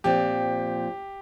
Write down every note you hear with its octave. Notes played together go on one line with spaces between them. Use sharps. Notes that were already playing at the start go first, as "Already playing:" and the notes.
A#2 F3 C4 G4